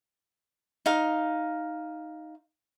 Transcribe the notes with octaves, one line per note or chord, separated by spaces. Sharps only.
D#4 F5